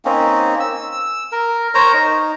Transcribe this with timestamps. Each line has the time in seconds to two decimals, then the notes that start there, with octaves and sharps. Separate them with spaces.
0.05 A#3 C4 C#4 D#4
0.60 E6
1.32 A#4
1.75 A#4 C5 C#5 A#5
1.94 D#4